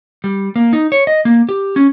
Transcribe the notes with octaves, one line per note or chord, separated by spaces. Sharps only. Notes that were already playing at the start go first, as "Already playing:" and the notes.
G3
A#3
D#4
C#5
D#5
A#3
G4
C#4